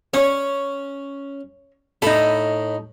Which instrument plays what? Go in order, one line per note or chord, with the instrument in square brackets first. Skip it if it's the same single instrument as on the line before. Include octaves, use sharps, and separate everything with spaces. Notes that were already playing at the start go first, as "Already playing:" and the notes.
[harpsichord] C#4 [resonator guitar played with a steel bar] C#5
[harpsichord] A2 B5 [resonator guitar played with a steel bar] D#4 A4